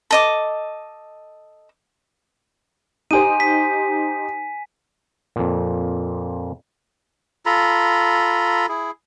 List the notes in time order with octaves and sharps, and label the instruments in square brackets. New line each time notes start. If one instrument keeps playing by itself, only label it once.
[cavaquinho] A4 D#5 D6
[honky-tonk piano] D#4 G4 C5 [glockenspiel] G#5 D#7
[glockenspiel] B6
[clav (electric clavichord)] F2 A#2
[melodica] F4 A4 A#5 B5
E4 G#4